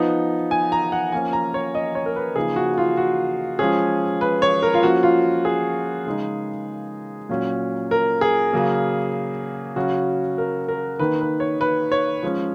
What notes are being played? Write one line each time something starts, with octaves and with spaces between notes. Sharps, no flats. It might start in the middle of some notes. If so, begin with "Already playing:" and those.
Already playing: F3 B3 D#4 F#5
G#5
A#5
F#5
F3 A#3 C#4 G#5
A#5
C#5
D#5
C#5
A#4
B4
C#3 F3 A#3 D#4 G#4
F#4
F4
F#4
F3 G#3 C#4 G#4
B4
C#5
A#4
F4
F3 A#3 C#4 F#4
F4
G#4
C#3 G#3 D#4
A#2 F#3 C#4
A#4
G#4
C#3 F#3 A#3
C#3 F#3 C#4 F#4
A#4
A#4
D#3 A#3 D#4 B4
B4
C#5
B4
C#5
F3 G#3 C#4